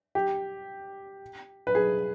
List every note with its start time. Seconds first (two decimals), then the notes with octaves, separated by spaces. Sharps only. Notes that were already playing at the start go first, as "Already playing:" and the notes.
0.15 G4
1.67 B4
1.75 G#4